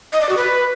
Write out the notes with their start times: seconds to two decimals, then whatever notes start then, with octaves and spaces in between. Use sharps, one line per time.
0.13 D#5
0.21 D5
0.29 F#4
0.37 B4